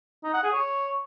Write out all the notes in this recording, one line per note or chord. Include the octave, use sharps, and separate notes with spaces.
D#4
F#5
G#4
C#5